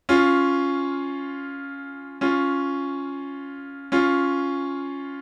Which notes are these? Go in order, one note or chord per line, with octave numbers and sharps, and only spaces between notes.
C#4 F4
C#4 F4
C#4 F4